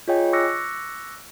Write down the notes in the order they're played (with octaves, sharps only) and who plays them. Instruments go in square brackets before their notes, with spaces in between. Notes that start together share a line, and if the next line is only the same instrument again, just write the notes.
[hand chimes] F4 G#4 C#5 D#5 G5 G#5
C#6 D6 E6 F#6 A#6 C#7